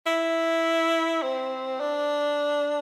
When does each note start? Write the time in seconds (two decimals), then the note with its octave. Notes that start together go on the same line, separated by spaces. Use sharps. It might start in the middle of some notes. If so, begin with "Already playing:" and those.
0.06 E4
1.23 C4
1.80 D4